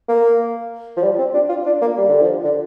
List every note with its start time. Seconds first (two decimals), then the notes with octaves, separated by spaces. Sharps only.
0.08 A#3
0.97 F3
1.03 G3
1.18 C4
1.34 D4
1.49 F4
1.65 D4
1.81 A#3
1.98 G3
2.08 D3
2.21 F3
2.44 D3